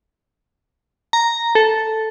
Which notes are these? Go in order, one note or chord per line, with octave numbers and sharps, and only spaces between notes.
A#5
A4